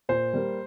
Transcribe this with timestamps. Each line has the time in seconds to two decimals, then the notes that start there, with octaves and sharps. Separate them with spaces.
0.09 A#2 C5
0.34 G3 A#3